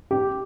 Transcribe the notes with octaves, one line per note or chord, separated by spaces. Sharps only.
G4